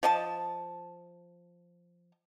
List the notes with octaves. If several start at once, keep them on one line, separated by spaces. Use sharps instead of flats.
F3 D#5 A5